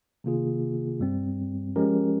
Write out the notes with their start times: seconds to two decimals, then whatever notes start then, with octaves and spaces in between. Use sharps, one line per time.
0.24 C3 D#3 A#3 F4 G#4
1.00 G2 G3 C4
1.76 F3 G#3 C#4 G4 A#4